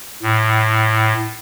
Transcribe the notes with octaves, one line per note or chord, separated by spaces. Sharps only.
A2